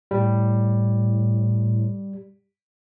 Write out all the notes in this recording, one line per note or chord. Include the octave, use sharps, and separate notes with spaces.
A2 G3